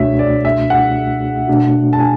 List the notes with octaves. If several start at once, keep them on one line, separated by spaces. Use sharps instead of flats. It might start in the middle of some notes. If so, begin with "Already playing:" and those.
Already playing: C#2 B2 A3 D4 F#4 C#5 E5
D5
E5
F#5
B2 A3 D4 F#4
A5
G#5